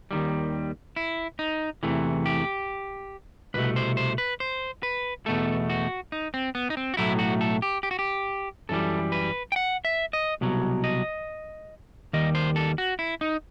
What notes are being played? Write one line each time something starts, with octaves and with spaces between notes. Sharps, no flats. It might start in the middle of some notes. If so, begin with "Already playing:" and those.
D#2 D#3 G3
E4
D#4
E2 C3 E3 A3
G4
C2 B2 A3 B4
C5
C5
B4
C5
B4
E2 B2 A3 A4
F#4
D#4
C4
B3
D#4
C4
F#4
B1 A2 F#3 A3 E4
F#4
A4
G4
G4
F#4
G4
F#2 E3 G3 A4
B4
G5
F#5
E5
D#5
C2 B2 F#3
D#5
D#2 D#3 G3 D#5
C5
A4
F#4
E4
D#4